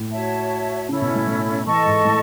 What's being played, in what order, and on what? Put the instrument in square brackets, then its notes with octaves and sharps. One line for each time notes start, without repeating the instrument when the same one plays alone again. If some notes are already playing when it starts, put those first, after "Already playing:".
Already playing: [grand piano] A2
[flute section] F#4 C#5 E5 A5
[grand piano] C#3 [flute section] C#4 E4 A4
[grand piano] B2
A2
A2
[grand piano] E3 [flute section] A4 D#5 A5 C#6
[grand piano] G#2
A2